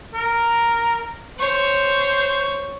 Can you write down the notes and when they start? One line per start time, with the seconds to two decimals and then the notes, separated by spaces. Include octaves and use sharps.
0.14 A#4
1.39 C5 C#5 C#6